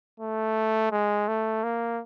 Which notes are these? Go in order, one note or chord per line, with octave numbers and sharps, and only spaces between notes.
A3
G#3
A3
A#3